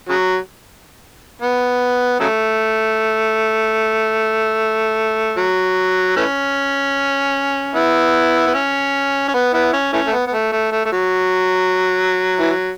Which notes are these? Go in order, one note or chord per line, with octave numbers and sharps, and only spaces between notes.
C#3 F#3
B3
C#3 F#3 A3
F#3
E3 A3 C#4
B3 E4
B3
C#4
C#4
B3
B3 E4
C#4
E3 A3 C#4
A3
B3
B3
A3
A3
A3
A3
F#3
E3
F#3